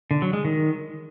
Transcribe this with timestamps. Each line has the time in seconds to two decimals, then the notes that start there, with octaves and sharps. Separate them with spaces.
0.11 D3
0.22 F#3
0.33 G#3
0.45 D#3